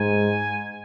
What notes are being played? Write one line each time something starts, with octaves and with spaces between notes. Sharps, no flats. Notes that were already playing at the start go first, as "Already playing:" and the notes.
Already playing: G#2 G#5